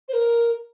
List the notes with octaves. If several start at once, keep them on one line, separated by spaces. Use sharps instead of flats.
C5
A#4